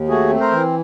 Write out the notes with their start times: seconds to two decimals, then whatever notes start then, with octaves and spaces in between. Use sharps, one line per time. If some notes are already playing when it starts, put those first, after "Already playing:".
Already playing: D#2
0.08 A3 F#4 G#4
0.30 C4
0.40 A#4 C5
0.51 E3